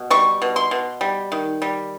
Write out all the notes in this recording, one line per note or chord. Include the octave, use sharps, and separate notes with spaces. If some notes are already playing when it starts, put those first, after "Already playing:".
Already playing: B2
G3 C#6
B2
C6
B2
G3
D#3
G3